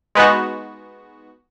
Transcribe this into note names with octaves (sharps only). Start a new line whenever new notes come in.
G#3 B3 D#4 F#4